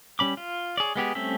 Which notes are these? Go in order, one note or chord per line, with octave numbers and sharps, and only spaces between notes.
G3 C#4 B5 D6
F4
G#4 C#5 D5
G#3 B3 G4 G#4
G3 A3 C4 C#4 E5